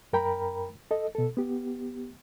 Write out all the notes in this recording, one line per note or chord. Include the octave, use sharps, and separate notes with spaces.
F#2 A#4 G5 A#5 B5
A4 D#5
B2 A4
B3 G4